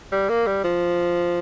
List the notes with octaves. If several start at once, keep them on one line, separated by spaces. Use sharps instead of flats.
G3
A#3
G3
F3